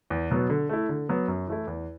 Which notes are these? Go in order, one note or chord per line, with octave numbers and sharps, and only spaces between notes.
E2
B2 F#3 B3
D3
A3 E4
D3
F#3 B3
F#2
E3 A3 E4
E2